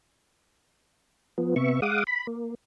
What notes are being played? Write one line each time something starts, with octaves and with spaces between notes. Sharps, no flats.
F3 B3
C3 B3 E5 C#6
G#3 F5 F#5 D6 D#6
B5
A#3